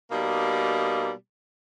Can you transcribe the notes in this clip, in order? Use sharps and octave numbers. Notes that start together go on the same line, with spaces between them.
B2 G3 A#3 D#4